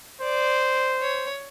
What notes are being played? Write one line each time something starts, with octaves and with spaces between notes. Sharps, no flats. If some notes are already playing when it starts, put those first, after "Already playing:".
C5 D5
C#5